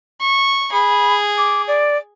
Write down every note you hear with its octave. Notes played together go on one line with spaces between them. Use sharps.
C#6
G#4 B5
D6
D5